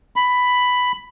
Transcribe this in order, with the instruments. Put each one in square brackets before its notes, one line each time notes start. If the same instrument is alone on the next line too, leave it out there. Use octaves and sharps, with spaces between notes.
[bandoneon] B5